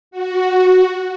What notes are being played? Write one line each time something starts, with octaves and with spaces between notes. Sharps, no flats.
F#4